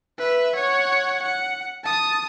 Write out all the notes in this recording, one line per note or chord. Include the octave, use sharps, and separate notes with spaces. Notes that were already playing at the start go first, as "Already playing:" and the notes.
B4 E5
C#5 F#5
F#5
A5 D#6